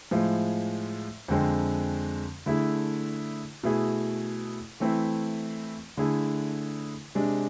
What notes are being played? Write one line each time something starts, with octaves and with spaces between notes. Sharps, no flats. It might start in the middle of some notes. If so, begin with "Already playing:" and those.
A2 F3 G#3
F2 D3 G#3 C4
D3 A3 E4 G#4
B2 A3 E4 G#4
E3 A3 C4 E4
D3 A3 E4 G#4
C3 G#3 D4